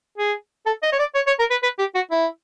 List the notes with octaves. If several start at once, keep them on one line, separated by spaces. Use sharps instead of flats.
G#4
A4
D#5
C#5
D5
C#5
C#5
A#4
B4
B4
G4
F#4
E4